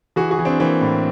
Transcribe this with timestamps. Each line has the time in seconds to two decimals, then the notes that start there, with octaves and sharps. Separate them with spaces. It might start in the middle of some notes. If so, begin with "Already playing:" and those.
0.16 E3 F#4 G#4
0.31 F#4 G#4
0.39 E3
0.45 C4 D4
0.59 E3 A#3 C4
0.81 A2